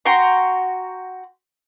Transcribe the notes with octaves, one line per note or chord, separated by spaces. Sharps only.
F#4 G5 A#5 C6